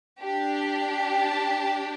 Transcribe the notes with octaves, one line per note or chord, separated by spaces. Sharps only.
D4 G4
A5